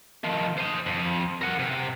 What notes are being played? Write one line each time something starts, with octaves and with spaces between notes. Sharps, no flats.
D#3 F3
C5 D#5
F2
A#4 F#5
C3